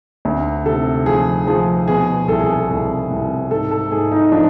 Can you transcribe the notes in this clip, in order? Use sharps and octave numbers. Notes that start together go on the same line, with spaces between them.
D2
C3 A4
F3 G#4
F3 G#4
B2 G#4
C2 A4
G#4
A4
C2
C2
G#2 A4
A4
G#2 G#4
D#4
F3 D4